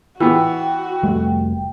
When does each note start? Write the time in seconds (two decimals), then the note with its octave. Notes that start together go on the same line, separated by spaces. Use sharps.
0.20 E3 B3 F#4 G5
1.03 F1 G3 A3